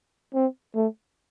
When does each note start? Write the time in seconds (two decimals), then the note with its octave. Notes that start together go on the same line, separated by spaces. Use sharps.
0.34 C4
0.75 A3